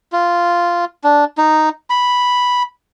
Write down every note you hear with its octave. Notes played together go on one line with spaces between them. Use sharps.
F4
D4
D#4
B5